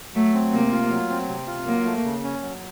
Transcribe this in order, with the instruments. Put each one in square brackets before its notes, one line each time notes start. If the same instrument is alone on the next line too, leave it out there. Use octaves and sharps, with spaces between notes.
[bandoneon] F#3 [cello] A3
[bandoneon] C4
[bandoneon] C3 [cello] A#3
[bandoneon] F4
F#3
C4
C3
F4
[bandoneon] F#3 [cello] A#3
[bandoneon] A3
C#3
C#4
F#3